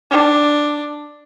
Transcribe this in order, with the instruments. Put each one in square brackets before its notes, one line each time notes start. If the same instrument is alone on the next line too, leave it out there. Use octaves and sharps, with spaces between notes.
[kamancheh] D4